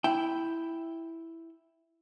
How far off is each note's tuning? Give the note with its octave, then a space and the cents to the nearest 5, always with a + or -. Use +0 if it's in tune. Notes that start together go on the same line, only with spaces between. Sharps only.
E4 +0 G5 +0